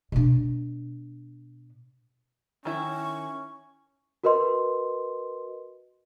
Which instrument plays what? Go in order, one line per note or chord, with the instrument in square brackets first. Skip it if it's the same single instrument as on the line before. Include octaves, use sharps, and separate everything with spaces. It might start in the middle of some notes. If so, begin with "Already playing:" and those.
[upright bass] B2 D4
[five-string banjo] D#3 E4 [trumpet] C#4 [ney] C#6
[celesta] F#4 A#4 B4 D#5 C6